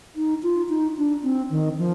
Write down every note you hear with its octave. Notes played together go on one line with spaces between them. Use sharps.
D#4
F4
D#4
D4
C4
D#3
F3